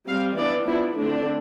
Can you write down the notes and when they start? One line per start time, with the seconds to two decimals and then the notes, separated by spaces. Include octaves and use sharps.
0.08 G3 C4 F5
0.38 E3 B3 D4 D5
0.67 F3 B3 D4 E4
0.97 D3 A3 C4 D4